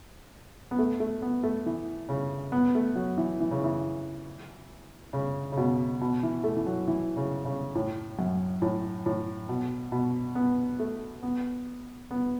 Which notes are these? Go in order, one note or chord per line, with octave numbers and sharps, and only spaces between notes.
B3
A3
A3
B3
A3
E3
C#3
B3
A3
F#3
E3
E3
C#3
E3
C#3
C#3
B2
B2
E3
A3
E3
F#3
E3
C#3
C#3
A2
F#2
A2
A2
B2
B2
B3
A3
B3
B3